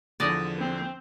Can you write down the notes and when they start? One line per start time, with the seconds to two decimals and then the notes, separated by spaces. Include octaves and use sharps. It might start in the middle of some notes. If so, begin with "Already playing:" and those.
0.20 E2 D3 F3 D5 D#5
0.59 C4